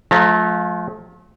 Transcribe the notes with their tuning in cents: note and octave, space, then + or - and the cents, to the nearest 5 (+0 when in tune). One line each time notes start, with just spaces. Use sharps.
F3 +25 A3 -35 A#5 -25